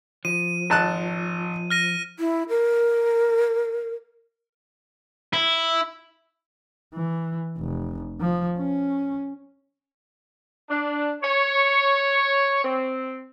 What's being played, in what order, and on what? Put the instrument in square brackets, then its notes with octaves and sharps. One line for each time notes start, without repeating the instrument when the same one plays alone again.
[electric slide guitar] F3 [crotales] D#7
[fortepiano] G#1 A5 F#6
[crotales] F6 A#6 D#7
[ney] E4
A#4
[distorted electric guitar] E4
[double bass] E3
F1
F3
C#4
[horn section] D4
C#5
C4